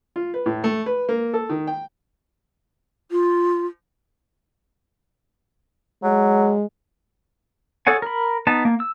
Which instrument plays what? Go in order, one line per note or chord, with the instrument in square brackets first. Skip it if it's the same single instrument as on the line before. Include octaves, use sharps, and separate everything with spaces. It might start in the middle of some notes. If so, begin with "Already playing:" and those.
[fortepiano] F4
B4
A2
A3
B4
A#3
A4
D#3
G5
[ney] F4
[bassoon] F#3 [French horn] G#3
[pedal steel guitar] G#4 A4 C#5 F#5 G#5
A#4 B5
B3 D#4 A5
A#3
E6